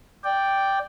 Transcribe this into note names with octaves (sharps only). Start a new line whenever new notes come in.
D5 G5